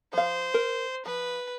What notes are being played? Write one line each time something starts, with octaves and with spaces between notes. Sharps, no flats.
F3 C5 F5
A#4
F3 B4